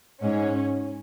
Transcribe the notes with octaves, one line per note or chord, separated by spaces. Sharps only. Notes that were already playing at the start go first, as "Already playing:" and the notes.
G#2 C#4